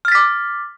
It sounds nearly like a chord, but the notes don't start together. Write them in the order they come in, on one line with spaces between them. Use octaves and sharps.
F6 A6 B6 D6